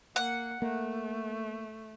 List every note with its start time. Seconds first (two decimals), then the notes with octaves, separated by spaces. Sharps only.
0.16 A#3 F#5
0.62 A3 A#3